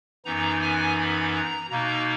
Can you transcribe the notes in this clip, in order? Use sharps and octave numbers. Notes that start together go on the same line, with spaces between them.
F#2 E3 B3 D#4 A#5
G#5
B5
A#5
B2 A#3 D#4 A#5